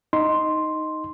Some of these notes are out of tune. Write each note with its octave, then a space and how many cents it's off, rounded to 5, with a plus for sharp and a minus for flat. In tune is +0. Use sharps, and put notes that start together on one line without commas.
D#4 +0 C6 +0